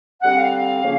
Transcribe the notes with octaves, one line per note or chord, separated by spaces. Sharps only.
D3 G3 C4 F#5
F5
C#3 F3 A#3